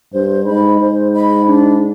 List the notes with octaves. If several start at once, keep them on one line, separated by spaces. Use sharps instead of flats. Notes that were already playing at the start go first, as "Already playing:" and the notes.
G2 C5
G#2 D#5 B5
G#2 C5
D#5 B5
D4